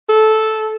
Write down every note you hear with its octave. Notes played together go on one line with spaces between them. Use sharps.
A4